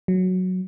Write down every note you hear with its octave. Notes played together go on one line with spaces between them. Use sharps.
F#3